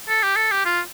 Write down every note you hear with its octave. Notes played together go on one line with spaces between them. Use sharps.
A4
G4
A4
G4
F4